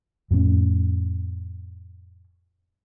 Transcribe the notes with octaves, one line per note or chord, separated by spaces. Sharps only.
F2 A2 C4 C#4